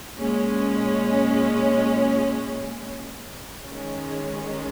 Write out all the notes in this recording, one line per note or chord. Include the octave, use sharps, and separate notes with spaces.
A#2 G#3 C#4
D#3 G#3 C#4